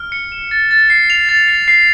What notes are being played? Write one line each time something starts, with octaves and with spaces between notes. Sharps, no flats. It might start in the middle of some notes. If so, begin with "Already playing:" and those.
Already playing: F6
C#7
E7
A6
A6
C7
F7
A6
C7
C7